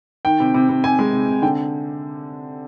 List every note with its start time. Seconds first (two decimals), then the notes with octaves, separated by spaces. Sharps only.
0.25 D#3 G5
0.40 C3
0.54 C3
0.69 C3
0.84 C3 G#5
0.99 G#3
1.13 C3
1.28 C3
1.42 D3 G5